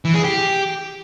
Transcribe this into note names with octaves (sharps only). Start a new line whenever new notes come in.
E3
G#4
G4